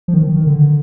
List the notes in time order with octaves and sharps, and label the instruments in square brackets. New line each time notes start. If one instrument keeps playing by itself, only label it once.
[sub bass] F3
D#3
D#3
D3